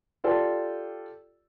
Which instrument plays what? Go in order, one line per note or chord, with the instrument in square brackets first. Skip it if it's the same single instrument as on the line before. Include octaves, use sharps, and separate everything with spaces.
[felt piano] F4 G4 A4 D5 G5